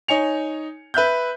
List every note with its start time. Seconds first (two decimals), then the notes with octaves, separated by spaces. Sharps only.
0.08 D#4 C#5 G#5 C#7 F7
0.94 B4 E5 F#6 G6